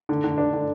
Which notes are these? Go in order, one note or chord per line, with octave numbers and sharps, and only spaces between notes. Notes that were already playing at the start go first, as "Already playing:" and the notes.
D3
D3
D4
D3